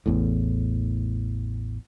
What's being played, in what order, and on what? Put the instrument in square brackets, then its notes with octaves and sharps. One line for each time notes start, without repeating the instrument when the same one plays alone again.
[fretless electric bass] A1 E2 A2